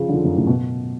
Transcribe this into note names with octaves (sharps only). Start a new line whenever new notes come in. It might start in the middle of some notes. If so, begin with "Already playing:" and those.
Already playing: C#3 F3
D3
C#3 F3
F#2
F#2 A2
B2